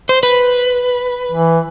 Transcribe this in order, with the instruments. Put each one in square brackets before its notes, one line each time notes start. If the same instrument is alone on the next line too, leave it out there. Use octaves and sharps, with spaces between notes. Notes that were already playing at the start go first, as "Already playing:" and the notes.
[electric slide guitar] C5
B4
[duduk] E3